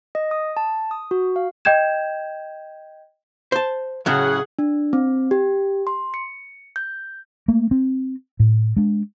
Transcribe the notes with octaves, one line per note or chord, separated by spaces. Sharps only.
D#5
D#6
A5
D#6
F#4
F5
D#5 G5 G6 G#6 E7
C5 A5
A2 C#3 F#3 G#4 F#5
D4
C4
G4
C6
C#7
G6
A3 A#3
C4
A2
G#3 D4